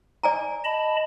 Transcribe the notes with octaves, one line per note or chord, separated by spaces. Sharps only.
D5 G#5 A#5
D#5 A5 B5